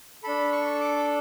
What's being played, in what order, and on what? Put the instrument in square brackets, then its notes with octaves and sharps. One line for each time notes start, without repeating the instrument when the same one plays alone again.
[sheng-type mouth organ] D4 A4 B5
C#6
D6